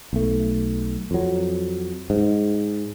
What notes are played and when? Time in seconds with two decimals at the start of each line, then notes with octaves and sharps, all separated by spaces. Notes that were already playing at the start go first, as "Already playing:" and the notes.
0.13 B1 A3
1.11 F2 F#3
2.10 G#2